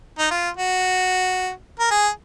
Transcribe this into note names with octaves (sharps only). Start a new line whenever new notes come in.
D#4
F4
F#4
A#4
G#4